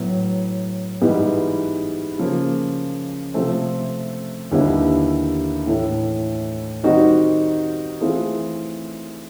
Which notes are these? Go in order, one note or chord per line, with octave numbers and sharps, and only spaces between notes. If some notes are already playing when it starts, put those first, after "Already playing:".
Already playing: A2 F#3 B3
G#2 E3 G3 B3
C#3 F3 A#3
C3 F3 A3 C4
D#2 D3 G3 B3 E4
A2 E3 A3
D#3 G3 C4 D#4 F#4
E3 A3 C4 F4 G#4